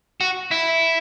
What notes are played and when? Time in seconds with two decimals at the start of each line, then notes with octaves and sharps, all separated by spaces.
0.21 F#4
0.51 E4